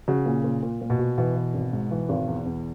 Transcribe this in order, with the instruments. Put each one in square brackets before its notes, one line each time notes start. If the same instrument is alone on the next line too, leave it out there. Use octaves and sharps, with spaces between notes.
[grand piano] C#3 [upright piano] F#4
[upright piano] A#2
A#2
A#2
A#2
[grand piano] B2
[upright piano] F#4
[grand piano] B2 [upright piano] E3
[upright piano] E3
G#1
G#2
E3
G#1
E2
E2